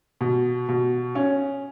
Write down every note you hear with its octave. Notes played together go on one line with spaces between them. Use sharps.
B2
B2
C#4